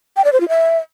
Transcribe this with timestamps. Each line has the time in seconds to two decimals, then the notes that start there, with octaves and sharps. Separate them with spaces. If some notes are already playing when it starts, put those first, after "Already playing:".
0.17 G5
0.25 D5
0.33 C5
0.41 F4
0.49 E5